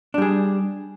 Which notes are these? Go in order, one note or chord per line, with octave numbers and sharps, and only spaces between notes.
G3 D4 G#4